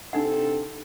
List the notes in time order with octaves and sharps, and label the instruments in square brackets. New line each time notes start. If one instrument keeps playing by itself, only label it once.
[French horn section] C3 C4 A4 [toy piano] D4 D#4 F#5